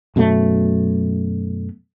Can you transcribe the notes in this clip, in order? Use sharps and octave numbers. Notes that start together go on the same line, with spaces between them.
F#2 B2 F#3 A3